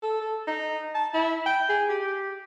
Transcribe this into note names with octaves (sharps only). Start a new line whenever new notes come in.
A4
A4
D#4
A5
E4
G5
G#4
G4